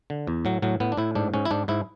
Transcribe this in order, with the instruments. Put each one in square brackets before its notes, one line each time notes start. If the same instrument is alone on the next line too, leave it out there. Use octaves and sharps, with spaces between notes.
[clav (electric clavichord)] D3
E2
A2 F#3
A2 F#3
A2 B3
D4
A2 E4
G#2 D4
G#2 C#4
E4
G#2 D4
G#2 E4